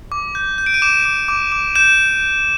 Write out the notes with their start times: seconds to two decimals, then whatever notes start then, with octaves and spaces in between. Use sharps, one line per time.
0.12 D6
0.35 G6
0.58 G6
0.66 D7
0.74 D#7
0.82 D6 E7
1.05 D6
1.28 D6
1.52 D6
1.75 G6 E7